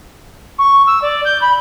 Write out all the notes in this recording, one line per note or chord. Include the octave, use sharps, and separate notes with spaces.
C#6
E6
D5
G6
B5